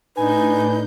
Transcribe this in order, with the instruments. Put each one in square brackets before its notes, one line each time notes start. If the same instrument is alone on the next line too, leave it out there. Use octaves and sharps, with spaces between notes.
[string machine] A2 D4 G6 [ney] D#4 [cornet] B4 [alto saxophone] G#5